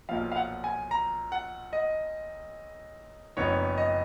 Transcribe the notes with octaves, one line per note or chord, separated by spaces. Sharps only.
B1 A#2 F3 F5
F5
F#5
G#5
A#5
F#5
D#5
F#1 F2 F3 B3 D#4 C#5
D#5